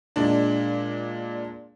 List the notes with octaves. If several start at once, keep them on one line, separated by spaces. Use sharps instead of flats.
A#2 G#3 D4